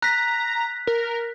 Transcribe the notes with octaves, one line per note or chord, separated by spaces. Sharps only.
A#5 F#6 B6
A#4